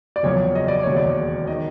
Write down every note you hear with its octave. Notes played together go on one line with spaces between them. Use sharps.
D5
F#1 E2 C#3 F3 C#5
D#5
D5
E1 D#2 C#3 C#5
D5
D#3 D#5